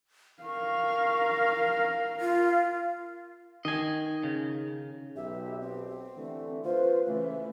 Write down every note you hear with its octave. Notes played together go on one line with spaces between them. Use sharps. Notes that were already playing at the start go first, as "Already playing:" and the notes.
A#4 F5 C#6
F4
D#3 D#5 G#5
C#3
B1 G4 E5
C4
D3 E3 A3
F4 B4 C5
C#3 E3 A3 B4